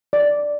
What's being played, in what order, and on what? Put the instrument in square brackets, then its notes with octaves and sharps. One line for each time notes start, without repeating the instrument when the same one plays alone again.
[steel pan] D5